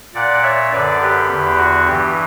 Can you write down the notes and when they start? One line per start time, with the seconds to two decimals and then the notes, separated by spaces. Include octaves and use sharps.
0.15 A#2 D5 F#5
0.43 C#5 E5
0.72 F#2 D3 B4 D5
1.01 G4 B4
1.30 E2 D3
1.58 F#4
1.86 G2 E3 G4